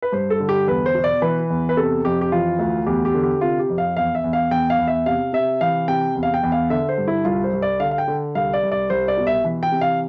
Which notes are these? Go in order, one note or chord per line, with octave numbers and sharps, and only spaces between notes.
B4
G2 C5
A4
D3
G4
E2 B4
C5
B2
D5
E3 B4
E2
B4
C3 A4
F2 G4
G4
E3 F4
D2
E2 G4
G4
D3
G4
C3 F4
G4
F2
F5
E2 F5
E5
E2
F5
E2 G5
F5
E2
E5
C3 F5
C3 E5
E3 F5
C3 G5
E2
F5
G5
E2
F5
D3 E5
C5
G2
E4
C2 F4
C5
C2
D5
D3 F5
F5
G5
D3
C2 F5
D5
C2
D5
C2 C5
D5
B2
E5
E3
G5
C3
F5